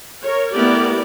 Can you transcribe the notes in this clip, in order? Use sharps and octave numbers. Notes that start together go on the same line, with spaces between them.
A#4 C#5
A3 B3 E4 G4 A#4 D5